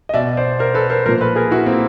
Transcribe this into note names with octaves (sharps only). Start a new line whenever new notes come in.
D#5
B2 D5 E5
C5 D5
A#4 C5
A4 B4
A#4 C5
A#2 F3 A#4 C5
A4 B4
G#4 A#4
E4 F#4
A#3 C4